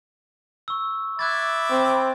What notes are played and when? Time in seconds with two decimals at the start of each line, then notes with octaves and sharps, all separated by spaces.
0.68 C#6 E6
1.19 E5 B5 D6 F#6 G#6 A6
1.71 C4